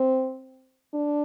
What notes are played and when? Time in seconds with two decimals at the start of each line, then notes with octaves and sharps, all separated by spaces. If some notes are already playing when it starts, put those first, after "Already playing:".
Already playing: C4
0.94 D4